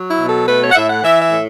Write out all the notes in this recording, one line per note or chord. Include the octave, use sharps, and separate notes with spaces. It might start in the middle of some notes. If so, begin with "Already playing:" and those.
Already playing: F#3
E4
B2
A4
A3 B4
C#5
F#5
A2 E5
F#5
E3 E5
E5
A2